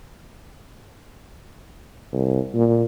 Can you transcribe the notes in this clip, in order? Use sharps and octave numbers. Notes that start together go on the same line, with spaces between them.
C2
A#2